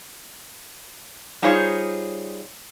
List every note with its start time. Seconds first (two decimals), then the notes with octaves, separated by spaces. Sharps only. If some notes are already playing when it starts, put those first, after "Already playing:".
1.42 G3 D#4 F4 G#4 C5 C#5